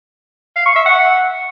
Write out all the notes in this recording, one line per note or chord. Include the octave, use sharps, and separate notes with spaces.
F5
C#6
E5
F#5